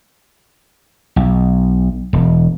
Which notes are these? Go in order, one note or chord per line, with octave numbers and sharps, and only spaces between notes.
B1
E1